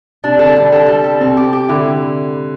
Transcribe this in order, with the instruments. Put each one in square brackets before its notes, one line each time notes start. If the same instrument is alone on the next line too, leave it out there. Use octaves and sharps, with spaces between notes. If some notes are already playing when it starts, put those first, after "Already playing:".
[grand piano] C3 [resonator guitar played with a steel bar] D4
[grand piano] D3 [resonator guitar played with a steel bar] A4
[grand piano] C3 [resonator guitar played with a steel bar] G3
[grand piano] D3 [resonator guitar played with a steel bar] A4
[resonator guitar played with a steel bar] G3
A4
[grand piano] C3 [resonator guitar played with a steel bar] C4
[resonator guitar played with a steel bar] G4
G4
[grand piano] D3 [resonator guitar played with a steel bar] E4